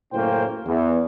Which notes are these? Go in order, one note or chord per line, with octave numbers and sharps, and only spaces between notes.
F#1 A2 A#3 C#4 C5 G5
E2